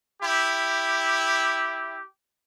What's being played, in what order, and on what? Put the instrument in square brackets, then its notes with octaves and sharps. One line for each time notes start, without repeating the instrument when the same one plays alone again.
[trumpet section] E4 G4